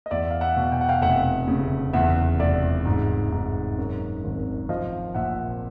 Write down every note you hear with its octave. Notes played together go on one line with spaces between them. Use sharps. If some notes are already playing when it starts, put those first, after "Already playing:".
D#5
E2 D5 E5
F5
E5 F#5
B2
G5
F#5
F5 G5
F1 E5 F#5
C#3
E2 E5 F#5
F1 D5 E5
G#2
G#2
F#2
G#1
F3 D#5 F5
A#1 E5 F#5